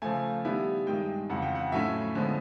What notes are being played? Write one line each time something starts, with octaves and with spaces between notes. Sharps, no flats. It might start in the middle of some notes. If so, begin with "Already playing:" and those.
C#3 F3 A3 G#5
D#3 G3 B3 E4
G2 D#3 G#3 G5
F2 C#3 E3 F#5
G5
F#5
A2 F#3 A3 C#4 E4 E5
D3 F3 G#3 B3